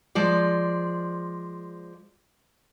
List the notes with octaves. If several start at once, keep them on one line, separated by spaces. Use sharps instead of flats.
F3 G#3 D5